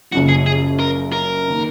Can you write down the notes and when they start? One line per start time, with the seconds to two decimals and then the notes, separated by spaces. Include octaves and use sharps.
0.12 F#1 F#2 C#3 F3 F#4
0.29 G#4
0.46 G#4
0.79 A#4
1.12 A#4
1.48 D#3 A#3